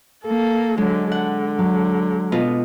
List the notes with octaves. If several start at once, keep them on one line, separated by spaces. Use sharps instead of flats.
A#3 A4
D3 F#3 G#3
D3 F#5
F#3
B2 B3 F4